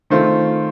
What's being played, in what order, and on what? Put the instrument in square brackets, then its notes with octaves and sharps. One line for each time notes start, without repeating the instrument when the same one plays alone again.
[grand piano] D#3 A3 C4 F4